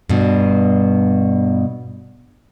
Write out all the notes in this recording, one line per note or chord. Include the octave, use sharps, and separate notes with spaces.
G2 B2